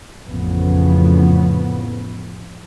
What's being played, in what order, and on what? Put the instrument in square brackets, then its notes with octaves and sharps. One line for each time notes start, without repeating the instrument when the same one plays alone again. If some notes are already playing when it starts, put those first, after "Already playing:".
[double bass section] A1 F2 C#3 F3 B3